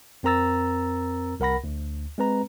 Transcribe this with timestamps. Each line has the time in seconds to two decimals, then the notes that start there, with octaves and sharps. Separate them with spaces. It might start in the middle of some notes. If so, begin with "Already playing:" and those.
0.23 F2 C4 A#4 A#5 E6 A6
1.40 C2 A#4 F#5 B5 A#6
1.64 D2
2.18 G#3 C4 B4 A#5